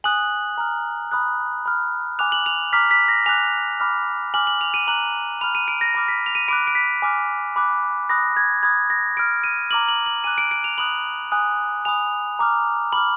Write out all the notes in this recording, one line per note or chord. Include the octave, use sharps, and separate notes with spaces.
G#5 D#6 F#6 F#7
A#5 F6
B5 D#6 F#6
B5 F6
G#5 D6 F#6 F7
F#7
F7
A#5 D6 F6 B6
B6
A#6
G#5 D6 F#6 F7
B5 D6 F6
G#5 D6 F6 F#7
F#7
F7
D#7
A#5 D6 F#6 F#7
B5 F6 F7
D#7
D7
A#6
B5 D6 F6 A#6
B6
F7
D#7
B5 D6 F#6 D7
D7
B6
G#5 D6 F6
B5 D6 F#6
B5 D#6 F#6 A#6
G#6
B5 D#6 F#6 G#6
A#6
B5 F6 D7
D#7
A#5 D6 F6 F#7
F#7
F#7
G#5 D6 F#6 D#7
D7
D7
F7
B5 D#6 F#6 F#7
G#5 D#6 F#6
G#5 B5 D#6 F7
A#5 D6 F6
B5 D6 F6 F#7